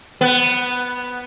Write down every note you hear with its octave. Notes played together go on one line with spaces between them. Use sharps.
B3